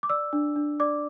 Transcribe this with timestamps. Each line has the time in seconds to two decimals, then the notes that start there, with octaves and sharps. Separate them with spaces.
0.03 D6
0.09 D5 E6
0.33 D4
0.56 D4
0.80 D5 D6